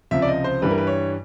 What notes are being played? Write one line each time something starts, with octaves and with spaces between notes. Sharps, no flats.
C#2 C3 F3 E5
D5
D#5
C5
G2 E3 G3 B4
A#4
B4
C#5